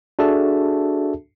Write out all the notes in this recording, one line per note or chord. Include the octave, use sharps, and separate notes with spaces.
D4 F#4 G#4 A4 E5 A5